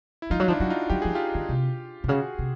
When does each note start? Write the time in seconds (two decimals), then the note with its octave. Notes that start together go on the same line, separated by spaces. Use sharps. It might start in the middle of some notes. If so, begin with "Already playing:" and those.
0.22 E4
0.30 F3 D#4 F4
0.40 F#3
0.44 F4
0.48 F3 D4 E4
0.60 F#3 F#4
0.70 D#4 F4
0.90 F#3 G4
1.02 F3 G#4
1.15 F4 G4
1.35 D#3
1.49 C3
2.04 C3
2.08 C#3 F#4 G#4
2.39 C3